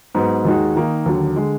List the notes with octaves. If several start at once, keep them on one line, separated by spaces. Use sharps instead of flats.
G#2 F#3 B3
D#2 D#3 G#3 D#4 F#4
D#3 A#3 D#4
D#2 D3 F#3
D3 G#3